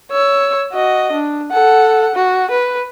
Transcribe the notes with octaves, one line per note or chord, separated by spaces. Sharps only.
C#5 E6
F#4 D#5
D4
A4 F#5
F#4
B4